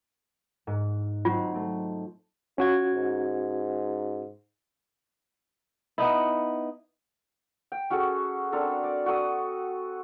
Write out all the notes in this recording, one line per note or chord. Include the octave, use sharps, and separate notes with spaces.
G#2
F#3 C4 D#4 F4
A3 C4
C#4 F4 F#4 G#6
G#2
B3 D#4 E4
G5
C#4 F#4 G#4 A4
C4 D4 A4 A#4
D5
F#4 A4 D#6